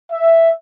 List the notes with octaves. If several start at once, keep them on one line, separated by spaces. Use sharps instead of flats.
E5